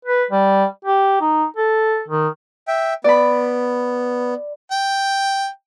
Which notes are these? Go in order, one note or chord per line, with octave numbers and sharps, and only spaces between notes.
B4
G3
G4
D#4
A4
D#3
E5 G5
B3 D5 B5
G5